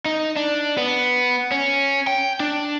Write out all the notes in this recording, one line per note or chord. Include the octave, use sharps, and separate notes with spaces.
D#4
D4
B3
C#4
G5
D4